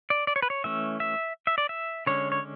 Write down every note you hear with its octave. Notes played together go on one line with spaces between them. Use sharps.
D5
D5
C#5
B4
C#5
E3 A3 C#4 E5
E5
E5
D5
E5
D3 G#3 C#4 C#5
C#5